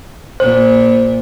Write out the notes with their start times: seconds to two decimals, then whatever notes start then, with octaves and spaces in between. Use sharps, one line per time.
0.40 A#2 C5